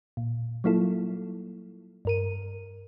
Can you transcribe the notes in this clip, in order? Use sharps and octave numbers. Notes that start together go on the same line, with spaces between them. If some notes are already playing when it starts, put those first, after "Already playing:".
A#2
F#3 G3 A#3 E4 F4 A4
G2 A#4 D#7